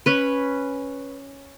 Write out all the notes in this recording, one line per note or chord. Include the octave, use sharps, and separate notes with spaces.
C#4 B4